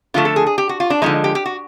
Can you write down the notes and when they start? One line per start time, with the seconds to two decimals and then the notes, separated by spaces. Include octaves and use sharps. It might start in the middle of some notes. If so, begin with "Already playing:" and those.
0.14 D3 F3 A3 F4
0.25 A4
0.36 G#4
0.47 G#4
0.58 G4
0.69 F#4
0.80 F4
0.90 D4
1.02 D3 F3 G#3 D#4
1.24 G4
1.35 G4
1.46 F#4